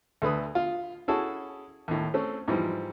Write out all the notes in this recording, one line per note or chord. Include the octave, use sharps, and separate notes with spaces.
D2 A3 B4 D#6
F4
C#4 E4 F#4 G#4 A4
D#2 A2
A3 C4 C#4
G#2 E3 F3 G3